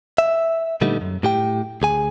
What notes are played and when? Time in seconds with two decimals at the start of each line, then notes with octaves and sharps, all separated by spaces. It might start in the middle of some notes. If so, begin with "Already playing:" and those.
0.18 E5
0.81 A#2 D3 G3 A3 B3 D#4
1.01 F#2
1.23 A2 G4 G5
1.82 D2 G#4 G#5